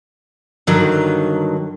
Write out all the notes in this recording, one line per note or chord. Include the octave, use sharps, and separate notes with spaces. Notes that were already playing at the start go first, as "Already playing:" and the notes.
G2 D3 D#3 F#3